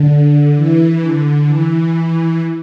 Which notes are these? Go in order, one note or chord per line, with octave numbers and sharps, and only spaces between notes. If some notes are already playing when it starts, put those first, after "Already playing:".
Already playing: D3
E3
D3
E3